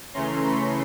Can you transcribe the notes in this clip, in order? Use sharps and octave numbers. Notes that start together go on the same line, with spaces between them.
C#3 E3 A3 C#4 A#5 C6
B5 C#6